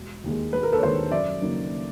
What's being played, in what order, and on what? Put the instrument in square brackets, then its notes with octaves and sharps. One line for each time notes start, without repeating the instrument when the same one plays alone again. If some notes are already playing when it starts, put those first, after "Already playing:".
Already playing: [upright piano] E1
D#2 D#3 G#3
E1 B4
A#4
A4 B4
C#5
D#2 D#3 G#3 A#4 C5
F#2 D5 E5
C#3 F#3 A#3 D#4